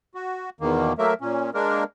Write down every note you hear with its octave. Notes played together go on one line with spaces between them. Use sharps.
F#4
E2 B2 D#3 A#3
F#3 A3 A#3 A#4 E5
A#2 C#4
G#3 A#3 D4 A#4